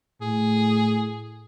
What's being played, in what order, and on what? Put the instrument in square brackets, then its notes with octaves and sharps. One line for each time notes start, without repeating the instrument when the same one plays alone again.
[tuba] A2 [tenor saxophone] G#4